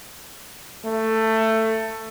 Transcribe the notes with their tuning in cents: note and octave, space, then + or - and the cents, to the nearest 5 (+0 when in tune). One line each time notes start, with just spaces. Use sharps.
A3 +15